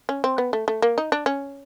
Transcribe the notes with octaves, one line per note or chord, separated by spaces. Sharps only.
C#4
C4
B3
A3
A3
A#3
D#4
D4
C#4